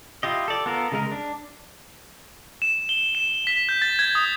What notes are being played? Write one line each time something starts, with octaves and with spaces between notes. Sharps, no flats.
E4 F4 G4 D#5
A4 D5
B3 F4 A4 A#4
C#3 G#3 A#4
D4
E7
G7
E7
B6
G6
A6
G#6
D#6